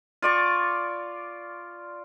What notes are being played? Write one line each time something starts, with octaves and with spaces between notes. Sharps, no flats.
F4 D5 C#6